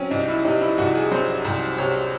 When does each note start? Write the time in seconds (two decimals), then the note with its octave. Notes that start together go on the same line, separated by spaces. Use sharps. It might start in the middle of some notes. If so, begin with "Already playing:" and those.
Already playing: F#3 C4 C#4
0.11 C2 D#4
0.28 E4
0.45 C3 D#4
0.61 E4
0.78 C2 F#4
0.95 G#4
1.11 F#3 C5
1.45 C2
1.78 C3 C#5